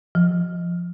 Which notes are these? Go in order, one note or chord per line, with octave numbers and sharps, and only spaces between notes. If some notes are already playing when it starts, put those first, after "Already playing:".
F3